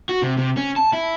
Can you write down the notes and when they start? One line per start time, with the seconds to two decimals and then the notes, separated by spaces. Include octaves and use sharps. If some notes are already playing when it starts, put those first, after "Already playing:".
0.09 F#4
0.22 C3
0.38 C3
0.57 C#4
0.76 A5
0.93 E4